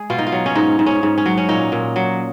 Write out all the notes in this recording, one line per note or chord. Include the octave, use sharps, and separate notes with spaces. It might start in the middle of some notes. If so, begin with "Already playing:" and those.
Already playing: G#3 G#4
B2 F4
D#4
F4
F#3
C#4
G#2 D#4
G#2
C#4
G#2
C#4
F#3
C#4
A#2 D#4
A#2
F#3